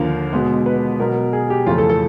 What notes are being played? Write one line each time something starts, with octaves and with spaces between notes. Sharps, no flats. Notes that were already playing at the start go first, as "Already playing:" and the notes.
Already playing: D#2 D3 F3 A#3 F5
B2 G#3 B3
B4
B2 F#3 B3 A#4
G#4
G4
F2 C#3 E3 A3 F4
A4
A4